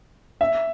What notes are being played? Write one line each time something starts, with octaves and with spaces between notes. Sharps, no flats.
E5